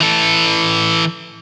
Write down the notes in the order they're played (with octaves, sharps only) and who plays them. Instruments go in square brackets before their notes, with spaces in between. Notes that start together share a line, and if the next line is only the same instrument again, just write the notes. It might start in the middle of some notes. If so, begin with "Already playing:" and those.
[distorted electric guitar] E3 A4